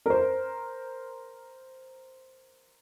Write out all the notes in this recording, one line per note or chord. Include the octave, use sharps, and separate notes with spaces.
A#4 C5